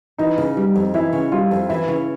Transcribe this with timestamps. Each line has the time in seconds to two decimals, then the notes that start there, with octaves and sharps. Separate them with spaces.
0.18 E3 D#4
0.38 C#3
0.57 G3
0.76 F2
0.94 E3 E4
1.13 C#3
1.32 G3 F4
1.51 F2
1.69 E3 E4
1.88 C#3